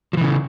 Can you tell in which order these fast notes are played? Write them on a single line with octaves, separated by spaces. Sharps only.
F3 E3 C#3